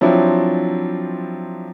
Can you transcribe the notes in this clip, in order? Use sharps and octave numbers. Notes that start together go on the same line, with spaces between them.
F3 F#3 C4 D4 E4